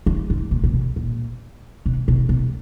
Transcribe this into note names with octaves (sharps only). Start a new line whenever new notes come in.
F#2
G#2
A#2
A#2
B2
A#2
B2
B2
B2